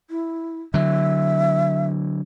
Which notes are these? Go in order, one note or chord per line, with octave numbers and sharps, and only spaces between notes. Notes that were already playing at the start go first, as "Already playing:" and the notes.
E4
D3 F#3 E5